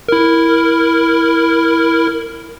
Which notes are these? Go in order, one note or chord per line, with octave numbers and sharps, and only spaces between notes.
E4 A#4